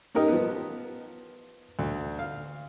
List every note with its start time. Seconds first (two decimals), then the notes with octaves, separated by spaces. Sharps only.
0.15 C#4 D#4 G4 A#4 D#5
0.28 F3 B3
1.79 D2
2.19 F5